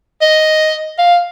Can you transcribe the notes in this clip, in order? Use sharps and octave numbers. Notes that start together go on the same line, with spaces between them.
D#5
F5